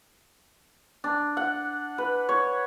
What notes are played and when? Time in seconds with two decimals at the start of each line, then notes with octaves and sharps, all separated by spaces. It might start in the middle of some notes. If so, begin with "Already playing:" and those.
1.04 D4
1.37 F#5
1.98 B4
2.29 C#5